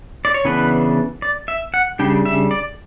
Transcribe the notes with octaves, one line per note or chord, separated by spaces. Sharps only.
D5
C#5
C#3 E3 B3 D4 B4
D5
E5
F#5
C#3 G3 D4 G5
E5
D5